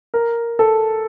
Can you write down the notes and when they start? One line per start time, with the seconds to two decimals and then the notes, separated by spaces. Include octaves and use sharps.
0.14 A#4
0.59 A4